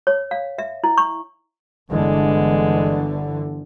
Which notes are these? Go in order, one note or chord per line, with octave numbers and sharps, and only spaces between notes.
C#5
F5
E5
E4
C#6
G1 D3 E3 G#3